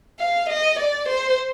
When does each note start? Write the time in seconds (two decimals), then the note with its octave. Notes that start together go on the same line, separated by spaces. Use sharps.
0.20 F5
0.49 D#5
0.79 D5
1.08 C5